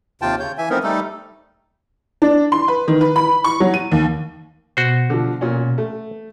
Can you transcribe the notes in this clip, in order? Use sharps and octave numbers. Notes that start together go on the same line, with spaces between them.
D#2 C3 F4 G5 A5
C#3 C#5 G6
E3 E5 G#5
F3 A3 B3 C4 D#4 A#4
G3 A3 D#4 A4
D4
C6
B4
D#3
B4
B5
C#6
F#3
D#7
D#2
B2 F#4 C5
D3 F3
A#2 C#4
A3